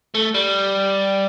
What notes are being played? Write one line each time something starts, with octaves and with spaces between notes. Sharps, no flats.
A3
G3